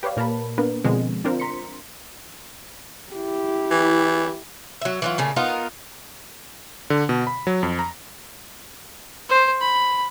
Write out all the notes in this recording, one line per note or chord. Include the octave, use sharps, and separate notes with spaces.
G4 B4 C#5 D5 F5
A#2 A#3 A#4 A5 B5
A#3 B3 D4 A#4 B4
B2 D3 F3 G#3 C4
C4 D4 F4 A#4 C5
A#5 C6 B6 C#7
E4 G4
E3
F#3 E5
E3 F#3 F4
A#2 C#3 A3
B3 D#4 F4 A#4
D3
B2
B5
F#3
F2
A#5
C5
B5